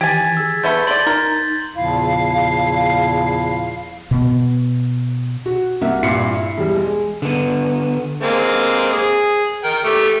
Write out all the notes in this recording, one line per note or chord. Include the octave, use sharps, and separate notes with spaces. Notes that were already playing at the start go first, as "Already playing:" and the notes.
D#3 E3 G4 G#5 G#6 A6 B6
G#4 E6
D3 A3 B3 G6 G7
D3 D5 C6 A6 F#7
D#4 A#4
E2 A#2 C#3 F3 E4 F5
B2 B3
F#4
C2 A#3 E5 F#5
G2 A#2 E4 C7 C#7
E4
E1 G3
G#3
D3 B3
G#3 A#3 C4
G#4
A#4 G5
A3 G4